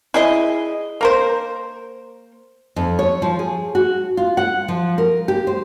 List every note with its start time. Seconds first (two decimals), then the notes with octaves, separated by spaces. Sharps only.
0.14 E4 G#4 D#5
1.01 A#3 A#4 C5
2.76 F2
2.99 C#5
3.22 F3
3.39 G#4
3.75 F#4
4.17 F4
4.37 F#5
4.68 F3
4.98 A#4
5.28 G4
5.47 C5